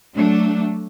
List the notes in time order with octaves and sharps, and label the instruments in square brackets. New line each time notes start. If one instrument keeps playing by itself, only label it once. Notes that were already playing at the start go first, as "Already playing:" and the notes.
[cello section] F#3 A3 D4